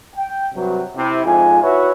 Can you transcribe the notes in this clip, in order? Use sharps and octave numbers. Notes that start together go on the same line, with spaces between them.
G5
G2 C3 F#3
C3 E4
F2 G#2 F4 G#5
E4 F#4 B4 C#5 E5